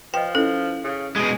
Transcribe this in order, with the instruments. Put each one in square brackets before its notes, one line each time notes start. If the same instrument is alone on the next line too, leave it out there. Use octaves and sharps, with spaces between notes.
[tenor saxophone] F3 [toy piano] B4 D#5 [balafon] G5
[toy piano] C#4 E4 [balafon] A4
[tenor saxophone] C#3
[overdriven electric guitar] B2 G#3 [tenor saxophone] G#4